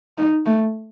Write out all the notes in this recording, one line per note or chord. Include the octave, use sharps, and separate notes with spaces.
D#4
A3